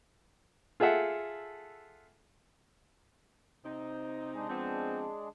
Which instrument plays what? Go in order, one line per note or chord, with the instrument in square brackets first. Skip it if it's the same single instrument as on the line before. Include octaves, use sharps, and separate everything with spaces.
[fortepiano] F4 G#4 A4 E5 F#5
[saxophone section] C3 C4 D#4
[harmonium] G#3 D4 G#4
[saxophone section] F3 B3 C4